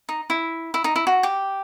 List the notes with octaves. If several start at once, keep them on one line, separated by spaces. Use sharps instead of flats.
D#4
E4
E4
D#4
E4
F#4
G4